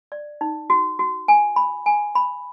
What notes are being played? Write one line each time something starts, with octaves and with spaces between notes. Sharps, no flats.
D5
D#4
F#4
F#4
G#5
B5
G#5
B5